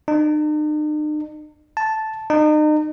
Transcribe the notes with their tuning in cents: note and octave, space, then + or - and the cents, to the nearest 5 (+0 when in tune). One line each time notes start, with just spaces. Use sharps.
D#4 -45
A5 -5
D#4 -35